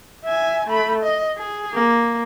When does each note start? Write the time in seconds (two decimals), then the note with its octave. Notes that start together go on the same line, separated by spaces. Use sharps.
0.24 E5 G#5
0.68 A3 B5
1.04 D#5
1.38 G#4
1.73 A#3